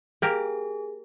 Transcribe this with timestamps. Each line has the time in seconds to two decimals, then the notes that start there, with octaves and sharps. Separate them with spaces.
0.22 A#3 G4 G#4 A#4